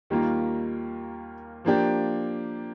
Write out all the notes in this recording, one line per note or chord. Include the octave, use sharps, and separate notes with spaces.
D#2 D#3 G3 A#3 F4
F3 A#3 D4 G4